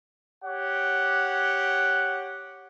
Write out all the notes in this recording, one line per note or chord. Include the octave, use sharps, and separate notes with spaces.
G4 C#5 F#5